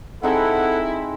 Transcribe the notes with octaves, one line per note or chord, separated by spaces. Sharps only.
C4 D#4 E4 G#4 A4 F#5